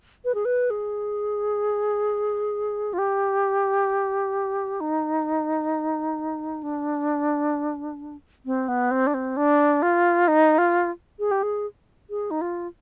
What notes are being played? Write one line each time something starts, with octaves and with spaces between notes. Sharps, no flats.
B4
G#4
B4
G#4
F4
G4
D#4
D4
C4
B3
C4
D4
C4
D4
F4
D#4
F4
G#4
G4
G#4
G#4
D#4
F4